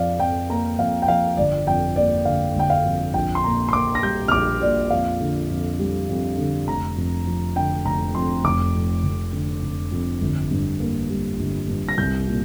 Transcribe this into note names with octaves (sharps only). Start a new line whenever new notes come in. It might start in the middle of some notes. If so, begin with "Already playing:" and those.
Already playing: F2 F3 D5 F5
F2 G5
A#3 A#5
F2 F5
G5
F3 F5
G1 D5
F2 G5
A#3 D5
D3 F5
G1 G5
F5
F2
A#1 G5
C6
A#2 A#5
C6
A#3 D6
A#6
G3 G6
F6
A#1 D6
A#2 D5
F2 F5
D3
F2
G3
F2
D3
F1 A#5
F2
F3
D3 G5
F1 A#5
F2 C6
F1 D6
F2
F1
D3
F1
F2
G1
G2
A#3
G3
G1
G2
A#6
C2 G6
A#2